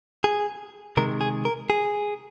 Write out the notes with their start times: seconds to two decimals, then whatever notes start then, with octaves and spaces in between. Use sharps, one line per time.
0.24 G#4
0.97 C3 D#3 G#3 A#4
1.21 G#4
1.45 A#4
1.70 G#4